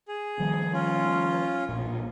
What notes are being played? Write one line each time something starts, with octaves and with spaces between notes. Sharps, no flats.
G#4
D#3 F3 G3
C#4 F4
B1 A#2